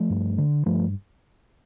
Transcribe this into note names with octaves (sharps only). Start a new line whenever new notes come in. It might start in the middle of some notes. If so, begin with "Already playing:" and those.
Already playing: F3 A3
G2
D3
G2 F3 A3